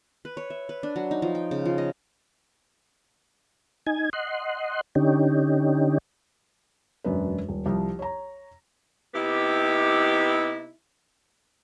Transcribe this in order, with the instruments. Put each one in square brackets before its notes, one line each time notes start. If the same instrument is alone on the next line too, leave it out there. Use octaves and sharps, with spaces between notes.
[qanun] B4
C#5
E5
B4
D4
F#3
D#4
F3
G5
C#3
F3
D#5
[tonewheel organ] D#4 G#5
D#5 F#5 C6
D3 C#4 D#4 G4
[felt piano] E1 F#2 D4 B4
D#1
C2 F3
C#5 A#5
[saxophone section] C3 B3 D#4 E4 G4